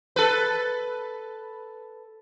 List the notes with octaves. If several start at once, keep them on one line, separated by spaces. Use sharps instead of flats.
A4 B4